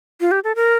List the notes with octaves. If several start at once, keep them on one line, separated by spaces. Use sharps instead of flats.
F4
G4
A4
A#4